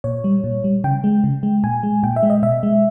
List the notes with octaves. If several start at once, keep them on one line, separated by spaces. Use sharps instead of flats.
A#2 C#5
G3
A#2
G3
C#3 G5
G#3
C#3
G#3
A#2 G#5
G#3
A#2 G5
E5
G#3
D#5
B2 E5
G#3